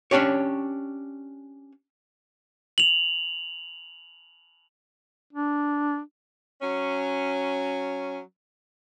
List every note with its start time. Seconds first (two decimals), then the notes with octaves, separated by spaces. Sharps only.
0.11 C#4 D4 G4 C#5
2.78 F7 F#7
5.33 D4
6.61 F#3 C#4